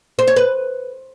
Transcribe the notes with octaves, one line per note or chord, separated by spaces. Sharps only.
C5
C#5
B4